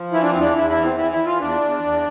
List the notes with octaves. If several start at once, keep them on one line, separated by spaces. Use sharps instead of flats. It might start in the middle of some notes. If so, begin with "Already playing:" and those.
Already playing: F3
E3 E4
D4
C4
E2 D4
E2 E4
E4
E3
C4
E3 E4
E4
E3
F4
E2 D4
E2
E2